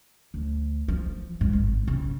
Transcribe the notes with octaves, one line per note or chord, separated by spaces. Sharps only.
D2
F3
G#2
G#1
C#3